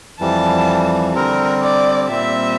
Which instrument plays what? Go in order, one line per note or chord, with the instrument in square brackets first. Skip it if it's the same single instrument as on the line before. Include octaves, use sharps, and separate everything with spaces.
[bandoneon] F2 E3 G3 [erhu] A5
[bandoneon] D3 G3 C4 [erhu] A#4
[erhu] D5
[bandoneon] A#2 G3 C4 [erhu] E5